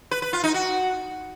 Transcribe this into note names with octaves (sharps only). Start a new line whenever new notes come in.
B4
B4
F4
D#4
F#4